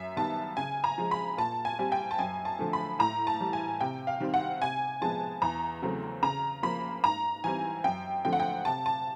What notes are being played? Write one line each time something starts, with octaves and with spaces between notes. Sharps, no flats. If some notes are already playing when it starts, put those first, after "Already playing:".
Already playing: F#2 E5
D#3 G3 B3 A5
C#3 G#5
A#5
F3 G#3
B5
A#2 A5
G#5
G3 C4
G5
A5
F#2 G#5
A5
D3 F3 A3
B5
A2 A#5
A5
E3 G3
G#5
C3 G5
F5
D#3 G3 C4
F#5
C3 G#5
F3 G#3 B3 A5
E2 A#5
C#3 F#3 A3 C4
C#3 A#5
F3 A#3 B5
G#2 A#5
E3 G3 C4 G#5
F#2 G5
D3 F3 A3 C4 G5
F#5
G5
C3 A5
A5